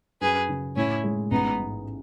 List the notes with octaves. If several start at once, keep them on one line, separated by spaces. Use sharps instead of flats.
F#2 G#4 B4
C#3
A2 C#4 E4
G#3
A1 B3 D#4
G#2